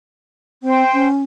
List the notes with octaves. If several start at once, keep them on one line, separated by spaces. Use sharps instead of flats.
C4 C5 G5
C#4